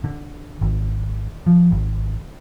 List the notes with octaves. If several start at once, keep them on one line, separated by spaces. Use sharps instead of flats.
D3
G#1
F3
G#1